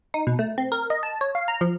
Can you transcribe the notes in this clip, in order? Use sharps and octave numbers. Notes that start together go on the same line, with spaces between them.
D#4
B2
A3
C4
A#4
D#5
A5
C#5
F5
A#5
F3